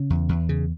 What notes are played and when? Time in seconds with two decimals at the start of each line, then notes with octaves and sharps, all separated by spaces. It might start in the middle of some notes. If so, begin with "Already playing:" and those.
Already playing: C#3
0.10 E2
0.29 E2
0.49 C#3